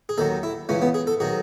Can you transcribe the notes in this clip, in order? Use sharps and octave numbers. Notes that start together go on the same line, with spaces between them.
G#4
D#2 D#3 F#3 A4
E4
C#2 C#3 E3 C#4
B3
G#4
A4
D#3 F#3 G#4